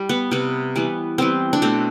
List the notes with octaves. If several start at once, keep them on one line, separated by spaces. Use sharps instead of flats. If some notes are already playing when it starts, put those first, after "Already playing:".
Already playing: G3
B3
C3 G3 B3
E3 G3 B3
E3 G3 B3 C4
D4
B2 A3 C4